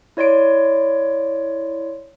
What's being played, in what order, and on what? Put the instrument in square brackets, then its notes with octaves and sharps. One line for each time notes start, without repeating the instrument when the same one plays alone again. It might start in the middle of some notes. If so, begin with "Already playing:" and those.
[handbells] E4 C#5 D5 C6 D7